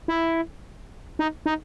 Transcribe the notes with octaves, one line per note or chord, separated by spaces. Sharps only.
E4
D#4
D#4